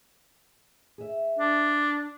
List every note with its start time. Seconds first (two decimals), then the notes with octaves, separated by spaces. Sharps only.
0.98 G#4 E5
1.39 D4